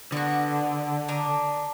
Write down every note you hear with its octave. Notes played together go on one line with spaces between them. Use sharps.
D3 B3 F#4
D4 A#5 D#6